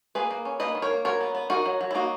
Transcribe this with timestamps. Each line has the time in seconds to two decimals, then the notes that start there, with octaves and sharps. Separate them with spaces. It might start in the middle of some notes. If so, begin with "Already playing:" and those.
0.15 A#3 G#4 B4
0.31 A#3
0.45 C#4
0.60 A#3 B4 D#5
0.75 D#3
0.82 A#4 C#5
0.90 A#3
1.05 F#3 A#4 C#5
1.21 B3
1.35 B3
1.50 D#4 F#4 A#4
1.66 F#3
1.81 F#3
1.91 E4
1.95 A#3 D#4 F#4